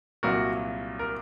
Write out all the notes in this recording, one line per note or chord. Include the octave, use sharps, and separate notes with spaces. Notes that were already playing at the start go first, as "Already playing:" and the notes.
C2 A#2 F#3 A#3 F#4 A#4
A#4